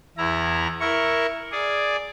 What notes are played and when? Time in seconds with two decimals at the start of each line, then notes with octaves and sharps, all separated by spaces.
0.17 E2 E4 A#5
0.80 E4 A#4 C#6
1.52 G#4 D5